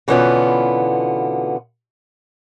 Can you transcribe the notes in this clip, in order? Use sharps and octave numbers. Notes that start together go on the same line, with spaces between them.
B2 D3 E3 B3 C#4 F4